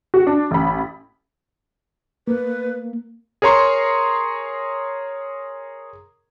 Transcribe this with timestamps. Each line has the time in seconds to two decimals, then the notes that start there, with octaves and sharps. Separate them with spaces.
0.14 F#4
0.27 D4
0.51 A1 B5
2.27 A#3 B4
3.42 G#4 A#4 C#5 A#5 C6 C#6